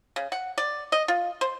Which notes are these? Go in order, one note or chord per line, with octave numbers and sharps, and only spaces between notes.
C#3
F#5
D5
D#5
F4
C5